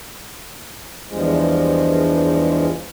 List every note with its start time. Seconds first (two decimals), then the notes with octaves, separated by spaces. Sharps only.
1.09 E2 G2 F3 G#3